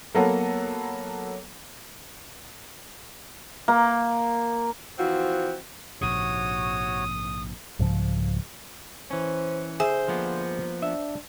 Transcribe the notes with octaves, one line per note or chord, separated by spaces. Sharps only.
F#3 A#3 B3 A4 F#5
A#3
E3 F3 C4 F#4
A#1 G#2 C3 F#4 C#5 D#6
C2 G#2 C#3 F3
E3 C#4 C5
D3 G#4 C5 E5
F3 A#3 B3
G2
D4 E5